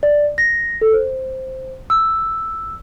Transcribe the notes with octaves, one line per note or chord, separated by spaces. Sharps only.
D5
A#6
A4
C5
E6